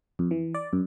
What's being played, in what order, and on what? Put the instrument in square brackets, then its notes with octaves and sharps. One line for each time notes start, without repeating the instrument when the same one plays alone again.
[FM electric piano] F2
E3
D5
F#2